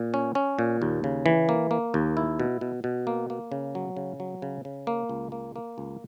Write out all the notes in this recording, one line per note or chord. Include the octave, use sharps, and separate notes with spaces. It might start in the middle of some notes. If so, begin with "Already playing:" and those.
Already playing: A#2
C#4
C#4
A#2
D#2
C#3
E3
A#3
A#3
D#2
E4
B2
B2
B2
A#3
A#3
C#3
F#3
C#3
F#3
C#3
C#3
A#3
C#2
A#3
A#3
C#2